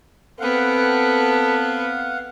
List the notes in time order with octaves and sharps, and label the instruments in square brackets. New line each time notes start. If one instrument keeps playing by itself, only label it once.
[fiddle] B3 C4 [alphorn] A4 [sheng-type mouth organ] F5 F#5